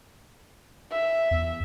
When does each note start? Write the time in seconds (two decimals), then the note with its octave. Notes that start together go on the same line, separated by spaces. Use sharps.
0.92 E5
1.31 E2